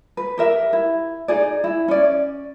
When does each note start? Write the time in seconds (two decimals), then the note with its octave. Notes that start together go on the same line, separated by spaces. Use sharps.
0.17 B4
0.38 G4 A#4 E5
0.73 E4
1.28 D#4 G#4 D5
1.64 E4
1.88 C#4 D5